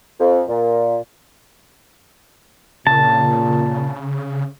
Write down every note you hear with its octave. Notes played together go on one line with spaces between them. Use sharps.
F2
A#2
A#2 C#3 A5